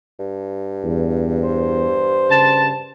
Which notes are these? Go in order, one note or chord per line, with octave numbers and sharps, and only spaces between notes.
G2
E2
C5
C#3 A5